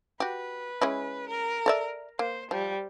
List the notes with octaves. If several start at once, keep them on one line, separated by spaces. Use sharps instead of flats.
F#4 G4 B4
G#3 C#4 E4
A#4
A4 D5 E5
A#3 C5
F3 G3